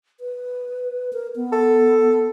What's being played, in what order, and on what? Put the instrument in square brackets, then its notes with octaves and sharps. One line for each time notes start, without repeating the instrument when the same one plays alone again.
[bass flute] B4
A#4
B3
[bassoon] A4